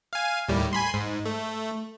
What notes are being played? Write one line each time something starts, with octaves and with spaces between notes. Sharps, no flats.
F5 G#5
D#2 A2 G3
G#5 B5 C6
G#2
A3